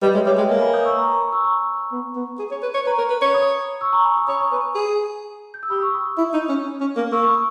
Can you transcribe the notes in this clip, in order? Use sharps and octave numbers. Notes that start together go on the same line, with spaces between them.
G3 B4 D#5
G#3 C#5 E5
G3 C#5 E5
G#3 D#5 G5
A#3 E5 G#5
G#5 B5
D#6 G6
C#6 E6
A#5 C#6
A#5 C#6
G#5 B5
C#6 E6
A#5 C#6
B3
B3
G#4
C#5
B4
C#5
B4 A#5 C#6
A#4
B4
C#5
B5 D#6
C#6 E6
A#5 C#6
G#5 B5
B5 D#6
C#5 B5 D#6
A#5 C#6
B4 G#5 B5
G#4
G6
E6
G4 B5 D#6
C#6 E6
B5 D#6
E4
D#4
C#4
C#4
A#3
A#3 C#6 E6
C#6
B5 D#6